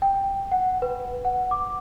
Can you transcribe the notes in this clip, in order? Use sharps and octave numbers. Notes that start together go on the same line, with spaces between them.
G5
F#5
B4
F#5
D6